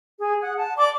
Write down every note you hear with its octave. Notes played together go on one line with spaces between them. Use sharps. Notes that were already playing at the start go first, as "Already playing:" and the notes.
G#4
F#5
A5
D5 C6 D6